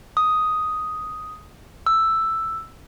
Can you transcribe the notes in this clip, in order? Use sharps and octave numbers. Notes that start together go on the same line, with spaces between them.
D#6
E6